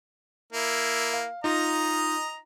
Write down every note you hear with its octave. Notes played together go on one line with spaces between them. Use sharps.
A#3 E4
F5
D#4 F4 D#5 A#5